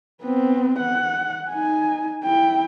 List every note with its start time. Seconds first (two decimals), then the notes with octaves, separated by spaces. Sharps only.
0.21 B3 C4
0.79 F#5
1.50 D#4 G#5
2.24 E4 G5